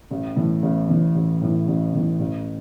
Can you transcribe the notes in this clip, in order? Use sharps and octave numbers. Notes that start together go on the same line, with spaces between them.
A1
A2 E3
A1
A2 E3
A1
A2 E3
A1
A2 E3
A1